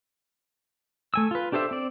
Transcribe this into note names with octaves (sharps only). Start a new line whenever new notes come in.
A3 G#5 E6
F4 B4
D4 G4 A4 C5 E5
C4 D5